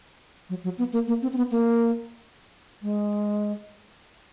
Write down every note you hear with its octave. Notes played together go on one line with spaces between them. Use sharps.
F#3
F#3
B3
A#3
A#3
C4
C4
B3
A#3
G#3